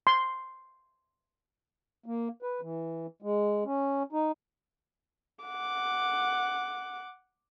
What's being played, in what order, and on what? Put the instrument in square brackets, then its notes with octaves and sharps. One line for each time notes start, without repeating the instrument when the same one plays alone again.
[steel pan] C6
[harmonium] A#3
B4
E3
G#3
C#4
D#4
[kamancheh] F#5 D6